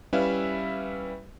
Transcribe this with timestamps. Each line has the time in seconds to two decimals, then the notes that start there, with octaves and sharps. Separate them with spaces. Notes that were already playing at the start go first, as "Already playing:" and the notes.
0.13 G3 C#4 E4 B4 E5 F5